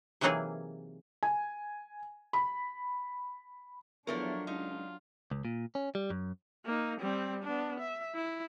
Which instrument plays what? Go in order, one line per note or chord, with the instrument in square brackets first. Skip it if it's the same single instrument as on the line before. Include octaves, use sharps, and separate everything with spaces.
[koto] C3 E3 F#3 A#3 D#4 G#4
[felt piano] G#5
B5
[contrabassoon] E2 [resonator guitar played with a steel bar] F3 A3 A#4 [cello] F#3 D4 [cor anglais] C#5
[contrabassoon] C#2 [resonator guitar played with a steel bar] D#4 [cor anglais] F4
[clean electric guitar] C#2
A#2
C#4
G3
F#2
[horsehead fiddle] A#3 D#4
G3 C4
B3 D4
E5
E4